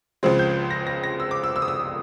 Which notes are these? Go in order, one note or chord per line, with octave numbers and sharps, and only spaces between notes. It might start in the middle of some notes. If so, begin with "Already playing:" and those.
C#2 C#3 F3 G#3 C4
G6
A#6
A#6
A#6
E6
D6
E6
E6
D#6
E6